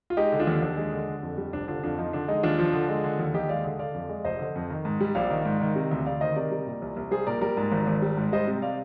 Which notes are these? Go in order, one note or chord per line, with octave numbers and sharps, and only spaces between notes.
F4
G#3 D#4 G4
D3
D4 F4
D#2
D#2 D4
G#3
D3
D3
F2
G3
F1 D4
D3 D4 F4
F2 D4 F4
F3 D#4
D3 D4
G#3 D#4
D#2 D4 F4
F3
D3
G#3
D3
D#2
D#2 D#4 G4
G#3 D5 F5
D3
D3 D5 F5
F2
G#3
F1 C5 D#5
D3
F2
D#3
G#2
G3
A#1 D5 F5
D#3
G#2
D#3
C3
D2
D2 D5 F5
D#3 C5 D#5
C3 A#4 D5
G3
A#2
C2
C2
G3 G#4 C5
A#2 A#4 D5
G3 A#4 D5
G#2
G#1
G#1
G3
G#2
G3 C5 D#5
C3
D5 F5